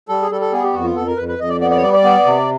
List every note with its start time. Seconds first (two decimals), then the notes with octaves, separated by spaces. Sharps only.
0.09 G3 A4
0.22 G#4
0.31 G3 A4
0.41 A4
0.52 B3 G#4
0.64 G4
0.74 F2 F#4
0.84 F4
0.96 F2 A4
1.07 A#4
1.17 F2 B4
1.28 B4
1.39 F2 D#5
1.49 D5
1.61 B3 D5
1.71 D5
1.77 C#5
1.81 G3 D5
1.93 D5
2.04 B3
2.25 C3